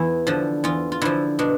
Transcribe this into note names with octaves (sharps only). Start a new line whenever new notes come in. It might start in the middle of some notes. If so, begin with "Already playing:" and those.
Already playing: E2 E4
D3 F3
E2 F4
F4
D3 F3 E4
B2 D4